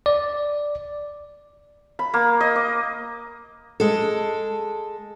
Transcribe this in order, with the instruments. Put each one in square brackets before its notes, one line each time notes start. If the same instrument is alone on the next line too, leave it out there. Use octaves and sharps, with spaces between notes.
[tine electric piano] D5
[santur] B5
A#3
D#5
D6
[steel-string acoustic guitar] G#3 A4